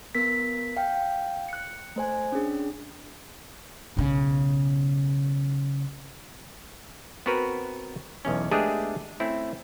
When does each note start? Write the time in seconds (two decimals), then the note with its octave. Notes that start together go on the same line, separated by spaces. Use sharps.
0.15 B3 A#4 B6
0.77 F5 G5
1.49 F#6 C#7
1.96 A3 C5 G#5
2.32 C#4 D4 G#4
3.97 B1 C#3
7.26 B3 C4 F#4 A#4 B4
8.25 B1 E2 C#4
8.51 G#3 A3 B3 D4 G4 G#4
9.20 A3 C4 C#4 E4